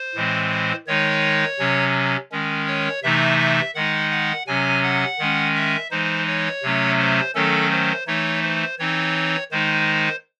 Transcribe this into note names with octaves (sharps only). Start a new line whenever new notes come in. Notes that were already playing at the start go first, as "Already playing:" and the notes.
Already playing: C5
A2 E3 G#3 C4
D#3 G#3 D#4 C#5
C3 F#3 C#4
D#3 G#3 C#4
C#5
C3 E3 A3 D#4 E5
E5
D#3 G#3 D#4 F#5
F#5
C3 F#3 C#4 G#5
F#5
D#3 G#3 C#4
E5
E3 G#3 D#4 C5
C#5
C3 F#3 A3 C#4
C5
D#3 F#3 A3 C#4 A4
C5
E3 A3 D#4 C#5
C5
E3 C4 D#4 C#5
D#3 G#3 D#4 C5